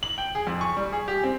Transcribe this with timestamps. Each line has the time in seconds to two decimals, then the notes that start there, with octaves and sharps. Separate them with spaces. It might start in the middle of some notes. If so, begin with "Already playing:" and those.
0.03 F#7
0.18 G5
0.35 G#4
0.47 F2
0.61 C#6
0.77 G3
0.92 G#4
1.08 G4
1.23 C4